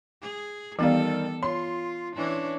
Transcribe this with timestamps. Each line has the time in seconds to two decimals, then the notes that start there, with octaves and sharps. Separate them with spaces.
0.22 G#4
0.79 D#3 E3 G3 B3 A4 F5
1.43 F4 C#5 C6
2.16 E3 C#4 D4